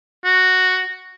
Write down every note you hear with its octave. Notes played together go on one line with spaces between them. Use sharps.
F#4